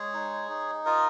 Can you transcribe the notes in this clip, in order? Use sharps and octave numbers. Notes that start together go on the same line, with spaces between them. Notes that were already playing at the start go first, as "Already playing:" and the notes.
Already playing: G#3 G#4 C#5
D#4
D#4
F4 A#4 D#5